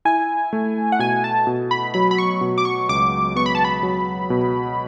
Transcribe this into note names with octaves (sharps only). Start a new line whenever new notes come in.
E4 G#5
A3
F#5
B2 G#5
A5
B2
B5
F#3 B5
B5
C#6
B2
D6
C#6
C#2 D6
B3 C#6
B5
A5
B5
F#3
B2